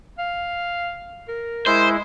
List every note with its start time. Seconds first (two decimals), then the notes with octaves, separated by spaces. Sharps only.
0.18 F5
1.29 A#4
1.66 G#3 E4 C5